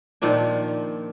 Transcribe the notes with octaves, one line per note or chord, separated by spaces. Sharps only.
A#2 D#3 F3 D4